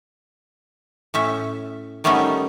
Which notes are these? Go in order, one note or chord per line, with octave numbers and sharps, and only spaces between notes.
A2 C#4 E5
D#3 G3 A3 B3 C#4 D#4